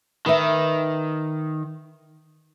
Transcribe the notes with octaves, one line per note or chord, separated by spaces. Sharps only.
D#3 B4 E5